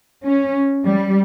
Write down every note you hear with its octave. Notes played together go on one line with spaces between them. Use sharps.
C#4
G3